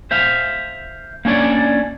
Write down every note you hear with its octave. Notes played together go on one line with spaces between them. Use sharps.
C5 E5 F5
A#3 C#4 D4 C#5 D5